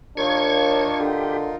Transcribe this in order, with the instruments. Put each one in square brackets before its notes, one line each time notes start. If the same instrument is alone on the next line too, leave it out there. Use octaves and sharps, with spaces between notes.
[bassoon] D#2 [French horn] D4 [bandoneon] D#4 F4 A#4 [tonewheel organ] C#6 G#6
[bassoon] D3 [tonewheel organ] G4